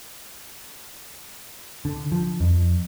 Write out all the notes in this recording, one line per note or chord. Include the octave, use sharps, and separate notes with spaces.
D3
F3
F2